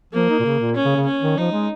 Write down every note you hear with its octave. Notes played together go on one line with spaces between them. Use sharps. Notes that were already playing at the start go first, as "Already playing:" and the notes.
F3 A#3
D#4
A#2
C#3
A#2
C#4
C#3
C#3
C#4
D#3
F3 D#4
G#3